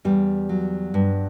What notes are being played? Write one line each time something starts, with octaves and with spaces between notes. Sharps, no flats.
E2 G3
F#3
G2